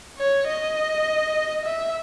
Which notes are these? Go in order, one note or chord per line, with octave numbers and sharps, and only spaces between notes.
C#5
D#5
E5